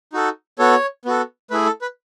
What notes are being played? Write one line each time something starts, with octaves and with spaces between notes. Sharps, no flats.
D#4 F#4 A4
B3 F#4 A4 C#5
B3 F#4 A4
A3 E4 G#4 B4
A4
B4